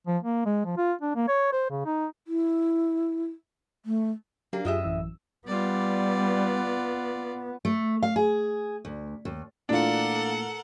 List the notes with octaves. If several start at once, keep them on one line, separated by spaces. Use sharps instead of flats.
F3
A#3
G#3
F3
F4
D4
A#3
C#5
C5
C#3
D#4
E4
A3
F#3 A#3 D4 G4
F#2 A2 F4 G4 G#4 D#5 E5
A1 E3 E6
G3 B3 F4 D5
A3
F5
G#4
D2
D#2
A#2 E3 A3 D4 F4 A4 A#4 F#5